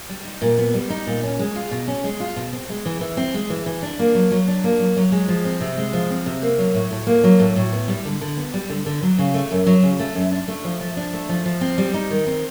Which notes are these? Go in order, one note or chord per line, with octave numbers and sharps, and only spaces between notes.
G3
D#4
A#2
B3
G3
D#4
A#2
C#4
G#3
F4
B2
C#4
G#3
F4
B2
C4
G#3
E3
E3
C4
G#3
E3
E3
D4
A#3
F#3
F#3
D4
A#3
F#3
F#3
G#3
F3
C4
C3
G#3
F3
C4
C3
A#3
F#3
A2
A2
A#3
F#3
A2
A2
B3
G3
D3
D3
B3
G3
D3
D3
F#3
C#3
A3
F#2
F#3
C#3
A3
F#2
D4
A3
F3
F3
D4
A3
F3
F3
C4
G3
D#4
D#3
C4